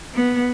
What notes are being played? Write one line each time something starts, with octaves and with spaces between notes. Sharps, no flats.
B3